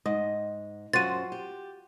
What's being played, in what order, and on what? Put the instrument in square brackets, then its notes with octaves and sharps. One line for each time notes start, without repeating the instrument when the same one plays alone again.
[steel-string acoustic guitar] G#2 [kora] D#5
[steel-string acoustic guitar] F#2 C5 [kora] F4 F#4 [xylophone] A6 D#7
[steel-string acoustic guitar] G4